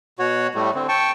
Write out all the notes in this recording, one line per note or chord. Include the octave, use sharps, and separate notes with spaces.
B2 F#4 C#5
A2 G3 A3
D3 C4
G5 A5 C#6